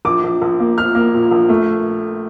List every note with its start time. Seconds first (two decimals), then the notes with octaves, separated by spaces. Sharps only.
0.05 A#1 D6
0.24 A#1
0.42 A#1
0.60 A#3
0.77 F3 F6
0.95 A#3
1.14 A#2
1.31 A#1
1.49 A3